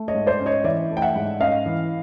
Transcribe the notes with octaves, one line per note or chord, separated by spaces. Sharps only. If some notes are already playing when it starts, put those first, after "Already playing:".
Already playing: A3
C#5 D#5
G#2
C5 D5
C#4
C#5 D#5
E3 D5 E5
A3
G5
E5 F#5
G#2
C#4 D#5 F5
E3